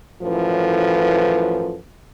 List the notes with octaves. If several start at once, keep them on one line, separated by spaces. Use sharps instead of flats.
F#2 A2 E3 F3 A4 B4